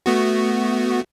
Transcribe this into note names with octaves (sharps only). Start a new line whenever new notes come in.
A3 B3 F#4